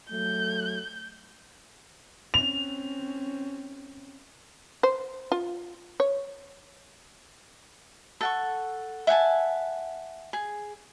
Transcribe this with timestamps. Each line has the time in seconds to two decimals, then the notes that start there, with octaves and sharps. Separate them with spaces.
0.10 F#3 A3 G6
2.34 C4 C#4 F7
4.83 C5
5.32 F4
6.00 C#5
8.21 A4 F#5 C#6
9.07 E5 F#5 G#5 A5
10.33 G#4